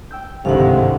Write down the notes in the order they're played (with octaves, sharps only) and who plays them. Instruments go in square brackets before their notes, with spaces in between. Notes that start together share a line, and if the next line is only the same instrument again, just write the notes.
[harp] G5 E6 G6
[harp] G1 C2 [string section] G#2 D#3 G#3 [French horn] C3 [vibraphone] F5 F#5